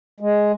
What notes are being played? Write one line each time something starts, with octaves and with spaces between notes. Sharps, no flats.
G#3